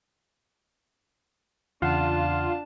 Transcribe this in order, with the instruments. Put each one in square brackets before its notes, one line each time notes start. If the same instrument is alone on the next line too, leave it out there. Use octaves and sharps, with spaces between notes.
[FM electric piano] E2 C#3 F#5 [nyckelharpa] D4 A5 [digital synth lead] F4